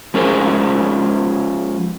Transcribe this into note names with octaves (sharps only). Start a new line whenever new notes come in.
F3 G#3 C#4 G#4 A#4 C5